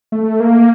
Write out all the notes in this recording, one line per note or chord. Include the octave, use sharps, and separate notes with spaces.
A3
A#3